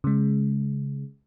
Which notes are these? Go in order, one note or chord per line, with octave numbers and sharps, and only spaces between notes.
C#3 G#3